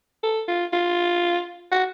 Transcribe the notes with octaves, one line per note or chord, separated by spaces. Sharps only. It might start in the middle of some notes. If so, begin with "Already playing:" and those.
A4
F4
F4
F#4